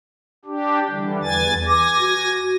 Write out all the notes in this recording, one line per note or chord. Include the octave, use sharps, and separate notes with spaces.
D4 G4
D3 E3 G3
E2 B4 G#5 A6
G#5 D6 A#6
F#4